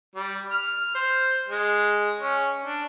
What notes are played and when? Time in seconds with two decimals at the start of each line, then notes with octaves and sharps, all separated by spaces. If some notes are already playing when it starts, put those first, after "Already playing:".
0.16 G3
0.51 F6
0.95 C5
1.48 G#3
2.19 C#4
2.65 D4